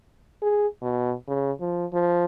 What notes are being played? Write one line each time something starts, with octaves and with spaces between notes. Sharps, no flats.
G#4
B2
C#3
F3
F3